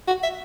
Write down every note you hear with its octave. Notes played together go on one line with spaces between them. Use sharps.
F#4
E5